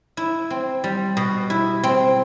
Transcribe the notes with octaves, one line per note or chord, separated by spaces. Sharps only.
E4
C4
G3
B2
E4
C4